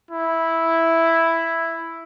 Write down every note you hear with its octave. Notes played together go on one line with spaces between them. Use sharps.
E4